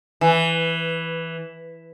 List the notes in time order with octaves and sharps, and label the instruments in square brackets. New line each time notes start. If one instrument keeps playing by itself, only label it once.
[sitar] E3